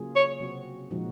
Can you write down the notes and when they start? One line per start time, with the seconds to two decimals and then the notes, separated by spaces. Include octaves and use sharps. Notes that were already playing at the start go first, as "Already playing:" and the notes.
Already playing: C#3 F#3 A#3 F4 G#4
0.16 C#5
0.40 C3 F#3 C4 F#4
0.91 A#2 F3 G#3 D#4 F#4